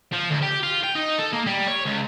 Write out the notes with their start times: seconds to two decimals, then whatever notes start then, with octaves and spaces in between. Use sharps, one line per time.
0.12 F3
0.30 D2
0.42 G4
0.63 F4
0.84 G5
0.95 D#4
1.19 A4
1.33 A#3
1.47 G3
1.68 C#5
1.86 C#2